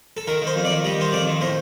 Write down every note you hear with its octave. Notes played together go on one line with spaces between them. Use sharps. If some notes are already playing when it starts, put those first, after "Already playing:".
A4
D#3 A#4
D#3 C5
F2
D5
D#3
G3 D#5
D#3 C5
F2 D5
D#3
A2 C5